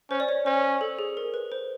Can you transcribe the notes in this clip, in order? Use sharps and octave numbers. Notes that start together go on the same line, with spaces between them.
C#4 C5
D5
C#5
C#4 C5
A4
G#4
A#4
B4
C5